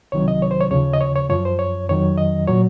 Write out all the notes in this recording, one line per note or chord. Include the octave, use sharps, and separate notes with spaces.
C2 C3 D#3 F#3 C#5
D#5
C#5
C5
C#5
D#2 C#3 F3 C#5
D#5
C#5
C#5
F#2 F3 C#5
C5
C#5
F2 D#3 F#3 C#5
D#5
A#2 F#3 C#5